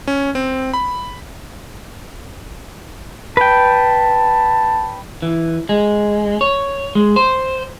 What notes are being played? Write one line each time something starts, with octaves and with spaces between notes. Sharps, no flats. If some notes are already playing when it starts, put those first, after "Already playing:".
C#4
C4
B5
B4 G5 A5
E3
G#3
C#5
G#3
C5